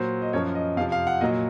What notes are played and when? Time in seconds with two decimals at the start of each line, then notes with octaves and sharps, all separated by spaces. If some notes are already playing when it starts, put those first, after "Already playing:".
Already playing: A#2 F#3 C5
0.22 D#5
0.33 F#2 F3 C#5
0.55 D#5
0.77 F2 C3 F3 F5
0.92 F5
1.07 F#5
1.21 A#2 F#3 D#5